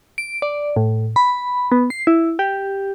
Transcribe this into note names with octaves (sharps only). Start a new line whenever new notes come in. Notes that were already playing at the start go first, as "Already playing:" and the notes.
D7
D5
A2
B5
B3
C7
E4
G4